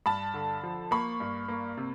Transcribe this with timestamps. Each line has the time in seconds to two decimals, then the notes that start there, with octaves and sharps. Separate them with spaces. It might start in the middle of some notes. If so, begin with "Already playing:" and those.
0.06 G2 A5 B5
0.34 D3
0.64 F3
0.91 A#3 B5 C#6
1.20 G2
1.48 A#3
1.77 C3